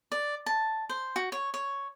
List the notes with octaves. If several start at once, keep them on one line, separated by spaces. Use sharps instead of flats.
D5
A5
C5
F#4
C#5
C#5